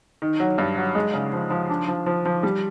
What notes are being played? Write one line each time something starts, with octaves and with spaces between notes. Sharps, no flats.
D#3
F#3
G2
F#3
G#3
C#3
F3
F3
D4
F3
F3
F3
G3